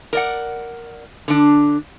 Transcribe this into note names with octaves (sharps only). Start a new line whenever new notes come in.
A#4 D5 F#5
D3 D4